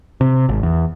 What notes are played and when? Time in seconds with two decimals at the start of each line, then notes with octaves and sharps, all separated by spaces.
0.21 C3
0.49 G#1
0.63 E2